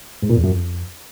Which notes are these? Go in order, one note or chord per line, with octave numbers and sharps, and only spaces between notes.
G#2
A#2
E2
F#2
F2